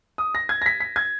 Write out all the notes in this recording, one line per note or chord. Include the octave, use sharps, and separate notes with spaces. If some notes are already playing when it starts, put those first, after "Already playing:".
D#6
A#6
G#6
A#6
B6
B6
G#6